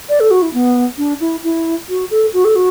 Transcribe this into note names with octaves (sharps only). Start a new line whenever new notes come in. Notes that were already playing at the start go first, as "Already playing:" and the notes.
D5
A4
F#4
E4
B3
D4
E4
E4
F#4
A4
F#4
A4
F#4